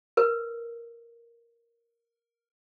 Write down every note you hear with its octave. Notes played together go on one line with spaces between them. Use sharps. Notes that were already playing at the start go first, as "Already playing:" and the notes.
A#4 B4